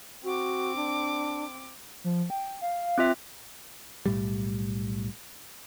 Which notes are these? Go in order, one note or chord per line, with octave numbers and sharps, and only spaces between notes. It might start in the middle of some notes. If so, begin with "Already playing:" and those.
C4 F#4 D6
D4
F3
G5
F5
C4 F4 E5
B1 A2 G3